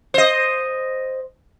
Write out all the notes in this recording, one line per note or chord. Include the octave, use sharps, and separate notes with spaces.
C5 D#5